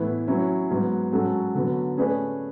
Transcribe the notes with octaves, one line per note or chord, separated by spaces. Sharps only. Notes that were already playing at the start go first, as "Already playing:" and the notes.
Already playing: A2 E3 B3 E4 B4
F#3 C#4 E4
G#2 F#3 B3
G#2 F#3 C#4 F#4 A4
D3 F#3 B3
A3 C#4 G#4 B4 D5